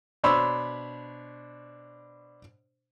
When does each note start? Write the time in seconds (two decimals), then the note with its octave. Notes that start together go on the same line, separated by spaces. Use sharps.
0.23 B2 D4 C5 C#5 B5 E6